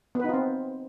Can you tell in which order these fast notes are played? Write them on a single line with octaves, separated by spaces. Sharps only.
B3 B4 D#4 F4 C4